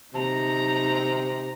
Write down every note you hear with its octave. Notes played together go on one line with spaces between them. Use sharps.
C3 D#4 A#5